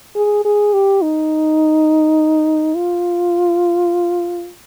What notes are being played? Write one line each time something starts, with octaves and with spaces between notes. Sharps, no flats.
G#4
G#4
G4
D#4
F4